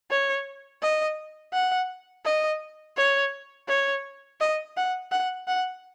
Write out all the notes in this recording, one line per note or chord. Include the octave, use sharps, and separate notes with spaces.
C#5
D#5
F#5
D#5
C#5
C#5
D#5
F#5
F#5
F#5